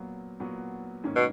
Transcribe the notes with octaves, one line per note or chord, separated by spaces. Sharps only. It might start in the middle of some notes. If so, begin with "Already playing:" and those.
Already playing: A#2 F#3 B3 F#4
A#2 F#3 B3 F#4
G#2 D#3 A#3 C#4
B2